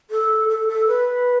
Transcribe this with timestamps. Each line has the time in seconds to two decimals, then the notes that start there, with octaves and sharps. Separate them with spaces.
0.10 A4
0.49 A4
0.68 A4
0.87 B4